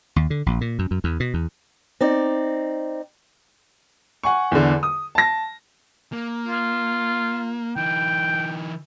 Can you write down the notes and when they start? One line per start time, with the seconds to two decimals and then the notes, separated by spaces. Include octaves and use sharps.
0.16 D#2
0.30 D3
0.46 A#1
0.61 A#2
0.79 F#2
0.91 F#2
1.04 E2
1.20 B2
1.34 E2
2.01 C4 D#4 D5
4.23 F#5 G#5 C#6
4.52 E2 D3
4.83 D#6
5.15 A5 A#6
6.13 A#3
6.46 F4
7.76 E3 D#4 G5